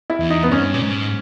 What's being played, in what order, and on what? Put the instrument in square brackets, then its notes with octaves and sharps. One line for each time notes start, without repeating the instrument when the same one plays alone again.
[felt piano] E4
[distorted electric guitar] E2
[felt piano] D#4
B3
[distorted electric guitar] G2 [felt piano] C#4
[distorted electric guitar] A#2
G#2